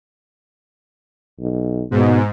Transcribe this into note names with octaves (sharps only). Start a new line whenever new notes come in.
B1
G#2 B2